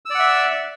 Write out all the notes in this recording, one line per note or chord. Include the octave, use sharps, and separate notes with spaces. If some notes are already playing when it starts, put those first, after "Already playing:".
D5 E5 F#5 E6